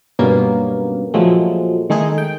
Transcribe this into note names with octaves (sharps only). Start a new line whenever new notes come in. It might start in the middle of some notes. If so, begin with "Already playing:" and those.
G2 B2 F#3 A#3 B3 C#4
A#2 F3 F#3 G#3 A3
D#3 G#3 A3 D#4 G#4
G5